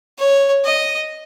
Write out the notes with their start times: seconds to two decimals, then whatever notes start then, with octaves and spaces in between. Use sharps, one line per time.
0.18 C#5
0.65 D#5